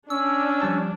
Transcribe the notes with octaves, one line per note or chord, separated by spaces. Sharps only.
C#4 D4 E6
F3 G3 A5